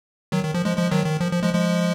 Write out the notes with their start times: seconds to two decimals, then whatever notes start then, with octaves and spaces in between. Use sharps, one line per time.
0.32 D#3 F#3
0.43 D#3
0.54 F3
0.65 F3 G#3
0.77 F3 G#3
0.91 D#3 F#3
1.06 D#3
1.21 F3
1.32 F3
1.43 F3 G#3
1.54 F3 G#3